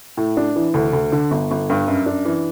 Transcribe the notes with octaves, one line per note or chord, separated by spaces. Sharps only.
A2
D4
E3
D2
D2
D3
G1
G1
G2
F#2
D4
E3